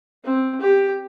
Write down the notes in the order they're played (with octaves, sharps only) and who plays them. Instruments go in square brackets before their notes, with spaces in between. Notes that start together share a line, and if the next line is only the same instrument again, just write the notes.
[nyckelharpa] C4
G4